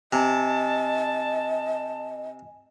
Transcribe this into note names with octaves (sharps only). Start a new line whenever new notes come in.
C3 D#5 G#5 A5